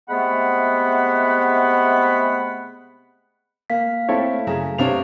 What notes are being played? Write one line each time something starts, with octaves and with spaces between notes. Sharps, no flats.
C3 G#3 A3 B3 F#5 B5
A#3 F5 B6
A3 C4 E4 A4 C#5
F#2 C#3 A#5
C3 B3 D4 C#5 F5 F7